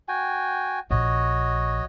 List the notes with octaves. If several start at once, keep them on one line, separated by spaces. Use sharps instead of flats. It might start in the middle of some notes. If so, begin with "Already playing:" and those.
F#4 G5 G#5
A#1 F#4 C#5 D#5